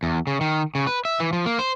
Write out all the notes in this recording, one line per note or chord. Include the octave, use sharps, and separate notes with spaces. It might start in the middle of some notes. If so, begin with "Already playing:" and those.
E2
C#3
D#3
C#3
B4
E5
E3
F3
A#3
C5